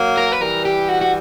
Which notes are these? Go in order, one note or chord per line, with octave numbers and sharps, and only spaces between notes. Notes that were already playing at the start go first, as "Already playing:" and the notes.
Already playing: F#3 A#3
A#4
B4
E3 G3 A#4
G4
F#4
F#4